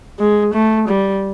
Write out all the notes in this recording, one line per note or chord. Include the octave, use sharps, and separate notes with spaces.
G#3
A3
G3